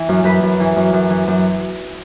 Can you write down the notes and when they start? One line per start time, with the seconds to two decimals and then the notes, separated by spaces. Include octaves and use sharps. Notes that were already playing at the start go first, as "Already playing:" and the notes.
Already playing: E3
0.09 F#2
0.24 F#2 B4 B5
0.43 F#2
0.60 E3
0.76 F#2
0.93 F#2
1.10 E3
1.28 F#2